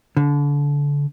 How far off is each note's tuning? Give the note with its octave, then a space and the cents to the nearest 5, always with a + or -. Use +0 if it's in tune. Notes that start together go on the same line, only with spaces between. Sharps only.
D3 -30